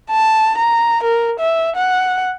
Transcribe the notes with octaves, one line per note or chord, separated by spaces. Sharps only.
A5
A#5
A#4
E5
F#5